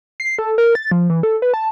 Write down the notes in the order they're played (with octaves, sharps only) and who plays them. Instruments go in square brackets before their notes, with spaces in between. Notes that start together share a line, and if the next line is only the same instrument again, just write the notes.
[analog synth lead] C7
A4
A#4
A6
F3
E3
A4
B4
A5